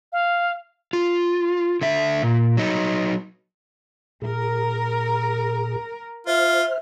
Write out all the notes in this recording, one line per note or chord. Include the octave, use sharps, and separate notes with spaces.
F5
F4
D3 E5
A#2
F#3 D#4
A#2 G#4 A#4
F4 C5 E5 F6